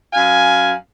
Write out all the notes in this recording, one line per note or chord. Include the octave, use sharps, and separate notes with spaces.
F#2 F5 G#5